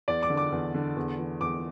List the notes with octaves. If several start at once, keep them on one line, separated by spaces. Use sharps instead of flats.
E2 D5
D6
D3
D6
E2
D3
E2
E3
E2 D6